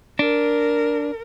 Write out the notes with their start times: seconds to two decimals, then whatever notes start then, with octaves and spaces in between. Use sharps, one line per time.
0.19 D4 A#4